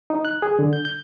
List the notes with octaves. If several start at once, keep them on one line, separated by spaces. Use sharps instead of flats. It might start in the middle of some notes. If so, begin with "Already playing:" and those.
D#4
F#6
G#4
D3
G6
G6